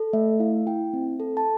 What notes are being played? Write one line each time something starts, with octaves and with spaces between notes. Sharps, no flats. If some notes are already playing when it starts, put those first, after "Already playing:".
Already playing: A4
A3 E5
E4 F5
E4 G5
C4
A4
A5